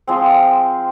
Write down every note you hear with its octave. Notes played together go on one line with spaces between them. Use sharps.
F3 G#3 C4